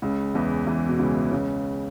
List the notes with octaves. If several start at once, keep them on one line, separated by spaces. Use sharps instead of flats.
C#2 C#3
E2 E3
E2 E3
B2
C#2 C#3
C#2 C#3